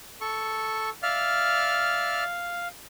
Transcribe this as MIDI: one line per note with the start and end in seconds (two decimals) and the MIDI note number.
0.21 0.90 69
0.21 0.90 85
1.03 2.24 74
1.03 2.24 76
1.03 2.68 77
1.03 2.24 89